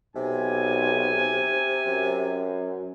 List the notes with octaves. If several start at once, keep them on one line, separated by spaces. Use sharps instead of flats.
B1 C3 G#5
F#2